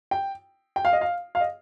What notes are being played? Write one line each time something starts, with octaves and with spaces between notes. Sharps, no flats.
G5
G5
F5
D#5
F5
F5
D#5